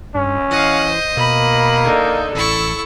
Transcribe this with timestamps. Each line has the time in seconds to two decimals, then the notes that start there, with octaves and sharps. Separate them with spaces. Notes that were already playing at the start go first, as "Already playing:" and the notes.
0.15 G2 C#4
0.51 E3 D#5 F5 F#5
0.87 C5
1.17 B2 A#3 B5
1.84 D3 D#4
2.35 A1 E4 A4 C#6